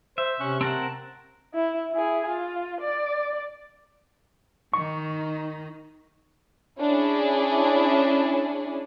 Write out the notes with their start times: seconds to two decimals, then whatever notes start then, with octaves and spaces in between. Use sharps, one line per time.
0.18 C5 E5
0.40 C3 C#4 C#6 F#6
0.61 C4 A#4 F#5 A5
1.54 E4
1.92 E4 G#4
2.28 F4
2.81 D5
4.74 D#3 D#4 C#6
6.79 C#4 D4 E4 G#4